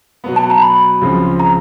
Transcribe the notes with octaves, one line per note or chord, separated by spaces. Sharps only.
B2 F#3 B3
A5
A#5
B5
C#2 C#3 F3 G#3 C4
A#5